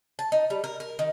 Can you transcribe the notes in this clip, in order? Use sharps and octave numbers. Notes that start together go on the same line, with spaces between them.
A5
D#4
G3
A#4
A#4
D#3